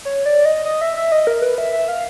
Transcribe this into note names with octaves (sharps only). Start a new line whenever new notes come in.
C#5
D5
D#5
D#5
E5
E5
D#5
A#4
B4
E5
E5
F5